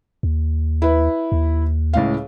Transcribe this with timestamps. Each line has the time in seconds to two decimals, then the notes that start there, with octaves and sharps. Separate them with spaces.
0.23 D#2
0.82 E4 B4
1.32 D#2
1.93 C#2 A2 F5